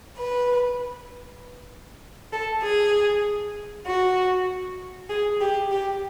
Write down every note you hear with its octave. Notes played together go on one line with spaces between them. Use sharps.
B4
A4
G#4
F#4
G#4
G4
G4